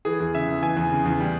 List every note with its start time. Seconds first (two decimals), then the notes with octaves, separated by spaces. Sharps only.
0.05 E3 G#4
0.20 E2
0.35 C#3 E5
0.48 E2
0.62 E3 G#5
0.76 E2
0.91 C#3
1.05 E2
1.20 G3